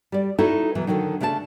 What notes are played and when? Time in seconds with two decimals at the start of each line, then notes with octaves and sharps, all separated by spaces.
0.12 G3 D5
0.39 D#4 E4 F#4 A4
0.75 B2 E3 F#3
0.87 D3 D#3 F#3 D#4
1.20 C#3 A3 D4 D5 A5